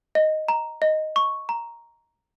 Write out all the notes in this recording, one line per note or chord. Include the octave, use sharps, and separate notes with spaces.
D#5
A#5
D#5
C#6
A#5